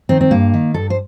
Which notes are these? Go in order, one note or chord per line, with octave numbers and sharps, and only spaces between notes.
D#3 C4
C4
G2 A#3
D#3
G2 A4
C5